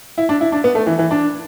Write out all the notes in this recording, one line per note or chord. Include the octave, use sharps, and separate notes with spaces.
E4
D4
E4
D4
B3
A3
E3
E3
D4